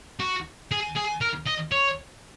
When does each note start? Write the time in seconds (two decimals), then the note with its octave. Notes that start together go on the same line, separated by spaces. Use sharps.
0.20 F#4
0.71 G#4
0.96 G#4
1.22 A#4
1.47 D#5
1.72 C#5